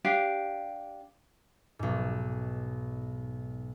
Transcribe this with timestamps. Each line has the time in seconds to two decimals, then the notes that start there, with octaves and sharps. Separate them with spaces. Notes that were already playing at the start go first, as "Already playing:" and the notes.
0.05 D4 G4 F5
1.79 B1 G#2